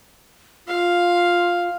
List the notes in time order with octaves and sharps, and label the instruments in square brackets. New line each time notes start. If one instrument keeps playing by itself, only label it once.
[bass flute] F4 [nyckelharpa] F5